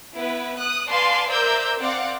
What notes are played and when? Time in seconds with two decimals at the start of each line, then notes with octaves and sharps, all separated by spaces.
0.17 B3 E4 B4
0.59 D#6 F#6
0.89 B4 D5 F5 G#5 A5 C6
1.29 A#4 C5 D5 E5 E6 G6
1.79 C4 D5 F5 F#5